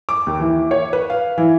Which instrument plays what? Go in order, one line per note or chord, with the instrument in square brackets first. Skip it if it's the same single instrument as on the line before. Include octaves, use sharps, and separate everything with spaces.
[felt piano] D6
D#2
E3
C#5
B4
F5
E3